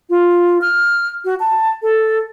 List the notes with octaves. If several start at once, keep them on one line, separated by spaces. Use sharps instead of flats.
F4
F6
F#4
A5
A4